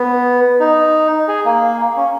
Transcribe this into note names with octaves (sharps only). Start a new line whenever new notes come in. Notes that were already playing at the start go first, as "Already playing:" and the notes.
Already playing: B3
D#4
G#4
A#3
C#4